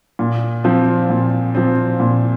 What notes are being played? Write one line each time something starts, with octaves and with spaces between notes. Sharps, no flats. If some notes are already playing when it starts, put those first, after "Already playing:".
A#2
F3 C4
A#2
F3 C4
A#2